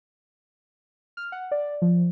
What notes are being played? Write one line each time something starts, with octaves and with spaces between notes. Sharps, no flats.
F6
F#5
D5
F3